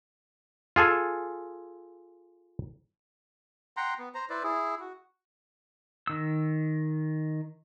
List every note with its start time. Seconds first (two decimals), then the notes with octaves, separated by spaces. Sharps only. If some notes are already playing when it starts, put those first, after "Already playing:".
0.76 F4 G#4 A4 G#5
3.77 F#5 G5 A#5 C6
3.99 B3
4.15 C5 A#5
4.30 E4 B4 C5 D5
4.43 E4 G#4
4.80 F#4
6.07 D#3 E6